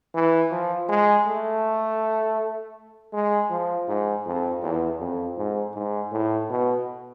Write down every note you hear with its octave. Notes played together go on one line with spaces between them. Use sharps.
E3
F3
G#3
A3
G#3
F3
G#2
F2
E2
F2
G#2
G#2
A2
B2